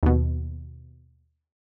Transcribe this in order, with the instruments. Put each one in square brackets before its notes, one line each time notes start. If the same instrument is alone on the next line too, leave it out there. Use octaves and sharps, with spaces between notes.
[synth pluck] D#2 B2